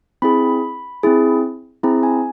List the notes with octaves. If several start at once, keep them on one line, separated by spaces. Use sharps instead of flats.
C4 E4 G#4 B5
C4 E4 G#4
C4 E4 G#4 A#5
G#5